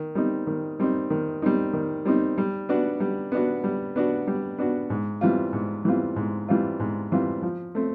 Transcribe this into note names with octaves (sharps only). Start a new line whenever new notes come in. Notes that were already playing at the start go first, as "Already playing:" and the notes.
Already playing: D#3
G3 C4 D#4
D#3
G3 C4 D#4
D#3
G3 C4 D#4
D#3
G3 C4 D#4
G3
B3 D4 F#4
G3
B3 D4 F#4
G3
B3 D4 F#4
G3
B3 D4 F#4
G#2
E3 G3 C4 F4
G#2
E3 G3 C4 F4
G#2
E3 G3 C4 F4
G#2
E3 G3 C4 F4
F3
A3 C4